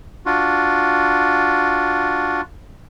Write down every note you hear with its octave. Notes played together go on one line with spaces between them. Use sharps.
D4 F4 F#4